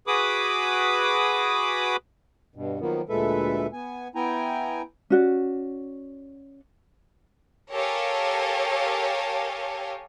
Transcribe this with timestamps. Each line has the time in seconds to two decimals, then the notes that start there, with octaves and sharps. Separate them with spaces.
0.07 F#4 G#4 B4 B5 D6 D#6
2.56 G2 B2
2.80 D#3 F3 F#3 A#3 B3
3.09 D2 A#2 G#3 A4 B4 E5
3.73 B3 G#5
4.15 B3 E4 G5 G#5 A#5
5.10 C#4 F#4 D5
7.73 G4 A4 A#4 C#5 F5 G#5